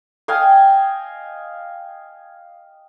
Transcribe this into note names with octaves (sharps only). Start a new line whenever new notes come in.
D#5 F5 G5 G#5